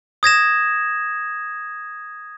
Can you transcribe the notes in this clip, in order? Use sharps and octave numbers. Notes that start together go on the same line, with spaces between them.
D#6 G#6 A#6 E7